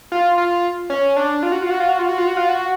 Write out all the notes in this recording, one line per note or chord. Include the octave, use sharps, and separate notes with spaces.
F4
F4
C#4
D4
F4
F#4
F4
F#4
F4
F#4
F4
F#4
F4
F#4
F4
F#4